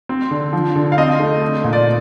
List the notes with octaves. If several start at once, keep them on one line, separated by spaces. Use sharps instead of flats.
C4
D3
F3
D3
F5
C4 D#5
A3
C4
A#2
D5